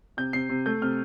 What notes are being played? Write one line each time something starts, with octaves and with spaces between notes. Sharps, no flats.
C3 G6
C3 C7
C3
A3 G6
C3 F6